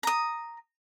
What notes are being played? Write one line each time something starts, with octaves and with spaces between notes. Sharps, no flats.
A#5 D#6